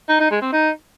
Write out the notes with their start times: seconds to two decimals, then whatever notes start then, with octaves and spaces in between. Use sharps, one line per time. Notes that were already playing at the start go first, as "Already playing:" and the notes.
0.09 D#4
0.20 D#4
0.31 G#3
0.42 C4
0.53 D#4